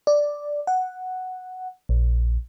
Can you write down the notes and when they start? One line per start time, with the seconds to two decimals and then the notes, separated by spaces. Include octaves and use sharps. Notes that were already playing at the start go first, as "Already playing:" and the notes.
0.07 D5
0.67 F#5
1.89 A#1